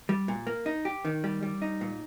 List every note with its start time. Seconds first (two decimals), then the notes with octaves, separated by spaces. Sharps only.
0.09 G3
0.28 A#2
0.47 A#3
0.66 D#4
0.85 G4
1.05 D#3
1.24 G3
1.43 G3
1.62 D#4
1.81 A#2